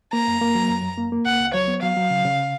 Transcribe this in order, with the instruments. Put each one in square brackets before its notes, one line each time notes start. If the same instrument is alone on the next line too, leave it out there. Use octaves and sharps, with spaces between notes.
[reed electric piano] A#3 [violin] A#5
[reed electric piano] F#2
A#3
F#3
F#2
F#2
A#3
A#3
[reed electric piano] C#2 [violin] F#5
[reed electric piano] C#2
[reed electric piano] F#3 [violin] C#5
[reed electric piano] B3
[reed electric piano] F#3 [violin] F5
[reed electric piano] F#3
C#3
C#3